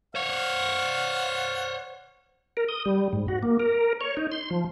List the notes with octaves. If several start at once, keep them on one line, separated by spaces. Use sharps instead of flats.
C5 C#5 F5 F#5
A#4
D#6
G3
G#2
F#4
A#3
A#4
C#5
D#4
C6
F3